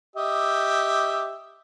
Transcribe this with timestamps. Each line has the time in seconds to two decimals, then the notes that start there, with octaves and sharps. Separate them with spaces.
0.16 G4 D#5 E5